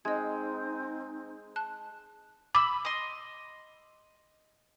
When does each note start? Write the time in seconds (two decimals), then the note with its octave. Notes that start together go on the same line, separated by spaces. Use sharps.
0.05 G#3 C4 D#4 D#5 G#6
1.56 A5 F#6
2.55 B5 D6 E6
2.85 D#5 C6